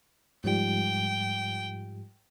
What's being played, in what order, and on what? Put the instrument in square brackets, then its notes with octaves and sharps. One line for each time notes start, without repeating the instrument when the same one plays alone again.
[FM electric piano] G#2 F3 G3 [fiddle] G5